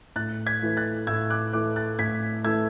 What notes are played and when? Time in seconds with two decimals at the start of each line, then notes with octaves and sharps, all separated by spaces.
0.16 A2 F#6 A6
0.46 G#6 B6
0.62 E3 A3
0.77 F#6 A6
1.07 A2 E6 G#6
1.30 D6 F#6
1.53 E3 A3 D6 F#6
1.76 F#6 A6
1.99 A2 G#6 B6
2.44 E3 A3 E6 G#6